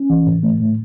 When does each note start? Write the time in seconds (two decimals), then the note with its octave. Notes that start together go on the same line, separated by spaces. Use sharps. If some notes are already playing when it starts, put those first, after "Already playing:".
Already playing: C#4
0.10 E3
0.26 A2
0.43 A3
0.60 A2